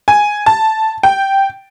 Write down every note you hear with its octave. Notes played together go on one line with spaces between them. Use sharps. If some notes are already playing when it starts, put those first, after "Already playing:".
G#5
A5
G5